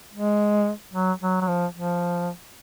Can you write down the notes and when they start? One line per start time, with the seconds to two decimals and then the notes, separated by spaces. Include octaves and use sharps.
0.14 G#3
0.94 F#3
1.21 F#3
1.41 F#3
1.48 F3
1.74 F3